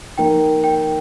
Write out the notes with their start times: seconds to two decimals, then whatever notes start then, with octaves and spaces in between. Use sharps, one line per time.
0.18 G#2 F3 A#3 D#4 A#4 G5
0.64 G5